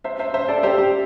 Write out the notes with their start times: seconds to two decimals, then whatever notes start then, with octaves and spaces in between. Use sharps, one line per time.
0.04 C5 E5
0.19 C5 E5
0.34 C5 E5
0.48 A4 D5
0.63 G4 C5
0.78 G4